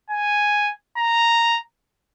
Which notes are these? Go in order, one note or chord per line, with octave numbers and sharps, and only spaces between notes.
G#5
A#5